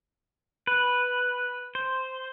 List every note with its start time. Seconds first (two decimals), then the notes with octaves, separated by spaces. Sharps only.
0.67 B4
1.75 C5